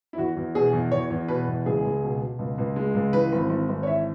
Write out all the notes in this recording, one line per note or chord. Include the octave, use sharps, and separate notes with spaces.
E4
E2 F#4
E2
B2 G#4
E2
E2 C#5
E2
B2 B4
E2
C#2 G#4
C#2
B2
B2
C#2
C#2
G#3
C#2
E3 B4
G#1
G#1
G#1
C#5
E3 E5